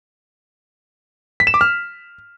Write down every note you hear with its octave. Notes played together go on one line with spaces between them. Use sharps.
B6
E7
D6
F6